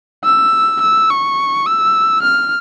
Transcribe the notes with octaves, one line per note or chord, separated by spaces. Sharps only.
E6
E6
C#6
E6
F6